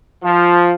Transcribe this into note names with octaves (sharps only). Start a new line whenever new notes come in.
F3